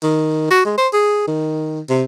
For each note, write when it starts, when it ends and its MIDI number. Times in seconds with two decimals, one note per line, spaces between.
0.03 0.48 51
0.51 0.63 66
0.65 0.74 56
0.78 0.88 72
0.93 1.22 68
1.28 1.80 51
1.89 2.03 48